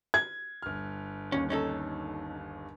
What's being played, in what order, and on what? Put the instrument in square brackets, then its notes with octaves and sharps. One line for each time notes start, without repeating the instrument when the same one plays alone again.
[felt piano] G#6
[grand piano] G1 F6
[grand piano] G1 D#2 [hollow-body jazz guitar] C#4
[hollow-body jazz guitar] C#4 D#4 A4